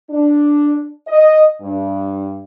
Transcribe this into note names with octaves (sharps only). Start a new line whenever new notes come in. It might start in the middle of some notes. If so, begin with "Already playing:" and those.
D4
D#5
G2